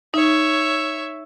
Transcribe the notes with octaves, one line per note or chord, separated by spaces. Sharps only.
D#4 C#5 E5